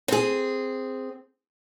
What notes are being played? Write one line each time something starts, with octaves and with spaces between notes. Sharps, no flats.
C4 G#4